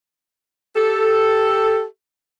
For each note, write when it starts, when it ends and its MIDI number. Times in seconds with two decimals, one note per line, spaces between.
0.76 1.84 67
0.76 1.84 69